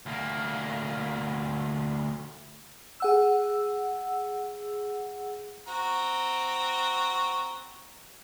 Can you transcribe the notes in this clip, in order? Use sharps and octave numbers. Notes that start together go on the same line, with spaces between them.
D2 A#3
G#4 F#5 E6
C4 F#4 A#5